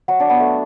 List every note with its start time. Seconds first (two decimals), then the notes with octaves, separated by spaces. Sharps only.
0.08 F#3 F#4
0.20 D4
0.30 B3
0.40 A3